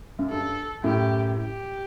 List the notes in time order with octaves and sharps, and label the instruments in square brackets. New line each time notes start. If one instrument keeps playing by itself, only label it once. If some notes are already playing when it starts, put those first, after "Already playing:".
[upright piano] F#2
[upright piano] G2 [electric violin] A4
[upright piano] F#2 A2 [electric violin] G4
[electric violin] G4